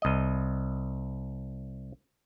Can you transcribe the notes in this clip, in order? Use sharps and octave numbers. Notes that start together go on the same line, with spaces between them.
C2 D#5